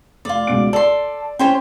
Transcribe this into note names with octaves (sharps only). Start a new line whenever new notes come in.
F1 F4 D5
C#2 B2 D7
A4 D5 C6
C#4 G4 C5 C#5